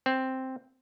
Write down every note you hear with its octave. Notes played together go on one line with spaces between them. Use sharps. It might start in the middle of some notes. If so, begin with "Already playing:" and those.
C4